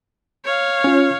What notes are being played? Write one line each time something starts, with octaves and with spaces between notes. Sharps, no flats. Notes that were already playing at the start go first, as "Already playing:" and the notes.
C#5 F5
C#4 F4